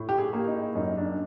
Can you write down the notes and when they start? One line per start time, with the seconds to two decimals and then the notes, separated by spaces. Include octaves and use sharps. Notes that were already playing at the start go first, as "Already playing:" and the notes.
Already playing: A2
0.09 G4
0.18 G#4
0.33 A#3
0.47 D#4
0.75 F#2 D#4
0.97 D4